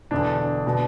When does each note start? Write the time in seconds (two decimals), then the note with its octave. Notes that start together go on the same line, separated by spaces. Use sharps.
0.11 E1 E2 D3 D4
0.67 B2